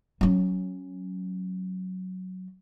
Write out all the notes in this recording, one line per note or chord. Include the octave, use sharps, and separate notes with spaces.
F#3 C#4